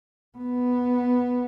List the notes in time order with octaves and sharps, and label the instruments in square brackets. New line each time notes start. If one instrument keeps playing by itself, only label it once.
[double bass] B3